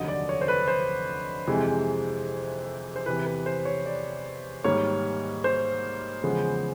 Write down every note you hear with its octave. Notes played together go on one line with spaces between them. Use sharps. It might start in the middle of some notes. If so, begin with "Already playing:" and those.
Already playing: F1 D#2 D3 F#3 D#5
D5
C#5
C5
B4
C5
F2 C3 E3 G#3
C5
E2 C3 E3 B4
B4
C5
C#5
D5
G#2 D#3 G3 A#3 C#5
C5
E2 C#3 F3 G#3 B3